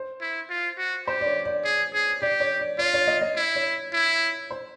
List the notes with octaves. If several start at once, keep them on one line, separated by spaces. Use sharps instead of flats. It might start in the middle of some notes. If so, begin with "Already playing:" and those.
Already playing: C5
E4
F4
F#4
G4 C5
D5
C#5
D5
G#4
G#4
G4 D5
C#5
D5
F4 C#5
C#5
D#5
D#5
E4
C#5
E4
C5